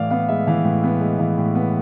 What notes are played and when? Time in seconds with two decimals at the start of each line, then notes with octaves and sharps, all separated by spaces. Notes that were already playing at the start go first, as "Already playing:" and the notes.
Already playing: A2 E3 D5 F5
0.11 B3 F5
0.29 G#3 E5
0.47 E3 F5
0.65 A2
0.83 B3
1.01 G#3
1.19 E3 F5
1.38 A2
1.55 B3